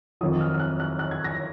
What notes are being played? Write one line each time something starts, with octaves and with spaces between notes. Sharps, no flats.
F2 D#3 F#3 D#6
F6
F6
F#6
F#6
F#6
G#6
A#6